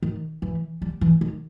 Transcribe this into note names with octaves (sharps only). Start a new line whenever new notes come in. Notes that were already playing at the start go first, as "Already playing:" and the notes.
D#3
E3
G3
E3
D#3